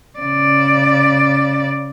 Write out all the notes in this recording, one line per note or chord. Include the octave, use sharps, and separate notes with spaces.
C#3 D5